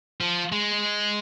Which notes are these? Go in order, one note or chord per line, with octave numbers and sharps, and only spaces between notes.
F3
G#3